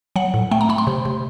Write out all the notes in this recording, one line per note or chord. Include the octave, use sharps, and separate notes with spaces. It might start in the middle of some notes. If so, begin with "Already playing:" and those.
F#3 F#5
A2
A3 G5
A#5
A3 B5
C6
C3
C3